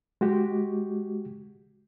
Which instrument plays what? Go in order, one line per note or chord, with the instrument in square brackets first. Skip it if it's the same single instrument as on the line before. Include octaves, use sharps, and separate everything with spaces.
[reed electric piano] G#3 F#4 G4